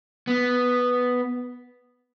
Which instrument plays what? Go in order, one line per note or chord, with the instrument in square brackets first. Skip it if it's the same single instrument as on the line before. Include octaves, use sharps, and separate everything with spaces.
[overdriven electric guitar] B3